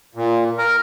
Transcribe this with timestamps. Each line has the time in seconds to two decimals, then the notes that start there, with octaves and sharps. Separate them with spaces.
0.15 A#2
0.58 A#4